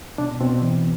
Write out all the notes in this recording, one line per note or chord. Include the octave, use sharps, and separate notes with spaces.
B2 D4
B2 C4
E3